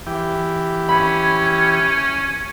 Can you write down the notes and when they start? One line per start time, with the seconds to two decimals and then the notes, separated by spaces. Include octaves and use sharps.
0.06 E3 G4
0.89 C#4 B5 G#6